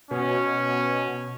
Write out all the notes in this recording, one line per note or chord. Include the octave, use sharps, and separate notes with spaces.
B2 C#4